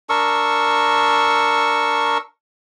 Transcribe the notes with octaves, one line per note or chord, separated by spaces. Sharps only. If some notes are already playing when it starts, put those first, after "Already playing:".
D4 A#4 C#6 E6